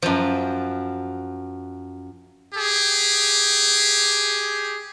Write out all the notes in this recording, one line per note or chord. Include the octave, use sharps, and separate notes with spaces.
F#2 F3
G4 G#4